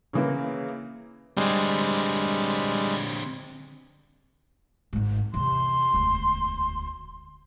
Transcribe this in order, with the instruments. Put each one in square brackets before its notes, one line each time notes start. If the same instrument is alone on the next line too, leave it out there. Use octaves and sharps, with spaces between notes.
[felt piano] C#3 E3 A#3
[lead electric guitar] D3 C4 [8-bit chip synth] G3 G#3
[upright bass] G#1 G#2
[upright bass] E2 C3 [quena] C6
[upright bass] E1 D2